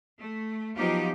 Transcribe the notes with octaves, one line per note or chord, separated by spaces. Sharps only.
A3
F3 F#3 B3 D#4 F4 G4